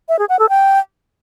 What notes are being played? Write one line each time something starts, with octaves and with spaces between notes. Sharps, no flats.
E5
G#4
F#5
A4
G5